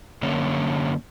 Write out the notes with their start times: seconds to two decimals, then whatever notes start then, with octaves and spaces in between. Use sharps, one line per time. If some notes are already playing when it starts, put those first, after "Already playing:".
0.22 F#2 D3 A#3 C#4 C#5